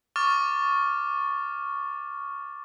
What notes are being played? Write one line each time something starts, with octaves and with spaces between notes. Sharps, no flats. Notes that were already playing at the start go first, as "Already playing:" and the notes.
C#6 D6 F6 A6